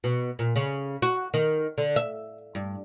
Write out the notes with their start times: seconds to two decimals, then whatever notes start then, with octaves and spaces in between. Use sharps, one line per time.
0.04 B2
0.39 A#2
0.56 C#3
1.02 F#4
1.34 D#3
1.78 D3
1.96 E5
2.55 G2